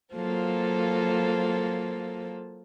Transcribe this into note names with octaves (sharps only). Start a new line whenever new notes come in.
F#3 A#3 F4 A4 C5